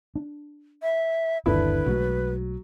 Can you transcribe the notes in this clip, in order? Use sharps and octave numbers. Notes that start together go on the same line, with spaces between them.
D4
E5
G1 D#2 D3 E4 B4
B1 F#3 G#3 A3